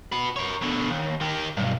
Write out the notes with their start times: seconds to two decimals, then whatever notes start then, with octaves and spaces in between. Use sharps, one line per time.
0.12 F#4 B4
0.36 A#4 C#5
0.62 B2 D3
0.90 D#2
1.21 D#3 G4
1.57 B1 G2